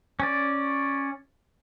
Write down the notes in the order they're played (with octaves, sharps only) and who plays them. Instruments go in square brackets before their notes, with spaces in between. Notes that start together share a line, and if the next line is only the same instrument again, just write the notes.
[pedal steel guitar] C#4 D5